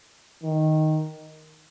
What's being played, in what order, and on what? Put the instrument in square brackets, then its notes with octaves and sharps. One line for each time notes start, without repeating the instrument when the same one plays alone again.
[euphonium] D#3